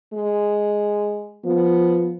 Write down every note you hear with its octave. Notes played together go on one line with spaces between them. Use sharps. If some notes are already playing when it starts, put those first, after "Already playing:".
G#3
F3 B3